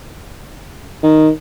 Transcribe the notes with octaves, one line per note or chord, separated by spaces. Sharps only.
D#3